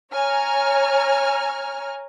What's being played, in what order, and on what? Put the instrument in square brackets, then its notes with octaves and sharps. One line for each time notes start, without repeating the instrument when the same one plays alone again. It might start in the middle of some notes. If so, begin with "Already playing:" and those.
[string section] C#5 G#5 A#5 F6